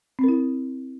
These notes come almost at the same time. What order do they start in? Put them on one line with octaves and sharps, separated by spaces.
C4 A#4 E4